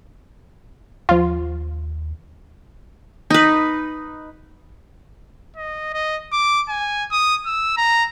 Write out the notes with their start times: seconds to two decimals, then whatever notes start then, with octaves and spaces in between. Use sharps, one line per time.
1.09 D#2 F3 F4
3.30 D#4 B4
5.57 D#5
5.94 D#5
6.32 D6
6.69 G#5
7.11 D#6
7.46 E6
7.77 A#5